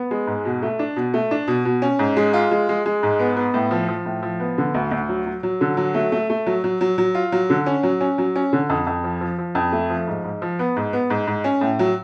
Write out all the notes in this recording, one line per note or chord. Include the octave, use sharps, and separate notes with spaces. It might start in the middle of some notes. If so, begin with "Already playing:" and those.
Already playing: B3
G#3
G#2
B2
A3
D4
B2
A3
D4
B2
B2
C#4
G#2
G#3
F4
G#3
G#3
G#3
G#2
B3
B3
A2
F3
F3
A2
F3
B3
D3
D2
D2
F#3
F#3
F#3
D3
F#3
A3
A3
A3
F#3
F#3
F#3
F#3
F4
F#3
D3
C#4
F#3
C#4
F#3
C#4
D3
F2
F2
F3
F3
F3
F2
A3
F3
G#2
G#2
F3
B3
G#2
B3
G#2
G#2
C#4
A2
F#3